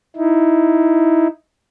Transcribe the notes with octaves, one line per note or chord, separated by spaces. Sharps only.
D#4 E4